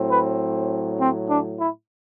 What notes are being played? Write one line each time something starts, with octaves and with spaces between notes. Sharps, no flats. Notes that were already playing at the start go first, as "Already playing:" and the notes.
Already playing: A2 F#3 C4
B4
C4
D4
E4